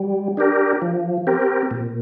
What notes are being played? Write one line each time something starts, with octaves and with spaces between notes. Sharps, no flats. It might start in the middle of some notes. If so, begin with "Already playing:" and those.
Already playing: G3
D4 G4 A#4
F3
C4 G4 A#4
A#2